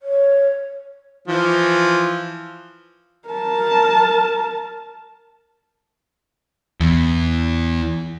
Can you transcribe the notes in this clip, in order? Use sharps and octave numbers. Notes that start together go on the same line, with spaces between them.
C#5
E3 F3
A#4 A5
E2